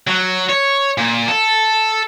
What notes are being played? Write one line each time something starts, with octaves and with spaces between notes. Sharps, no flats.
F#3
C#5
A#2
A4